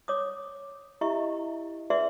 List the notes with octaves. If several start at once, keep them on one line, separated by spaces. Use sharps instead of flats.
C#5 D6 D#6
E4 G4 D#5 E5 A#5 C#6
F#4 G#4 B4 D5 E5 C6